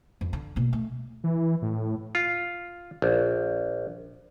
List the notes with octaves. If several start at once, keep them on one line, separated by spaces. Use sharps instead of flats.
F2
D3
B2 A#3
A3
E3
A2
F4
A#1